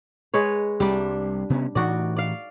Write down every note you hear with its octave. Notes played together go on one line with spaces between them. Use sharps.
G#3 B4 C#5
C2 G3 D4
C3 B3 C#4
A2 E3 D#4 F#4 D5
D5 F5